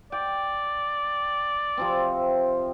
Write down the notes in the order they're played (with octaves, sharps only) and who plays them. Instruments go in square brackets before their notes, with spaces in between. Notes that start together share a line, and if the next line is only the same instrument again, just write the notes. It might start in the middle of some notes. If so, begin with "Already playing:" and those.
[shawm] D5 [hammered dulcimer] G5
[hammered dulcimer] C3 F3 C4